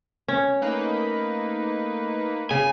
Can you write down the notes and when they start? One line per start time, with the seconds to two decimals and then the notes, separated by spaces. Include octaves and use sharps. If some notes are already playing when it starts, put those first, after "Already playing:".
0.28 C#4 C#5
0.62 A3 A#3 D#4 B4
2.51 C#3 G#5